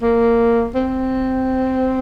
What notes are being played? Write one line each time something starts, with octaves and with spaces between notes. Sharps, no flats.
A#3
C4